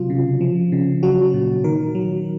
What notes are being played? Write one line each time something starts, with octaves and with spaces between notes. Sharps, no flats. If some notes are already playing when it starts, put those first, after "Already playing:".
Already playing: C3 F#3 F4
C#3
F3
C#3
F#3 F#4
A#2
D#3 A#4
F#3